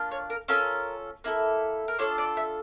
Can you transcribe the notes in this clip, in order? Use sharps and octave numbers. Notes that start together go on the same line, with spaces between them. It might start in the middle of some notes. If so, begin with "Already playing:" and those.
Already playing: A#3 D4 F4
C#5
A#4
C#4 F4 A4 A#4
A#3 E4 A4
A#4
D4 F4 A4 C#5
D5
E5